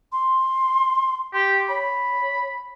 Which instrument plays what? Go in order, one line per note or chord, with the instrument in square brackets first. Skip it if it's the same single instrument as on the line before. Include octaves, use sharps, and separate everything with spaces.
[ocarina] C6
[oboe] G4 [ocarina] C6
[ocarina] C#5 [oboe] B5